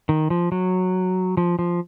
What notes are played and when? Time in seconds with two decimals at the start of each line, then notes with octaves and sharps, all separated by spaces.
0.09 D#3
0.30 F3
0.52 F#3
1.37 F3
1.59 F3